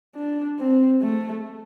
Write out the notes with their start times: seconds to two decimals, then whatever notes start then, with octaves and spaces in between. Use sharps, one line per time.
0.15 D4
0.59 C4
1.02 A3